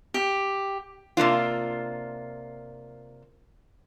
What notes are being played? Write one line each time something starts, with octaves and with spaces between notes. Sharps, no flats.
G4
C3 A#3 D4 F4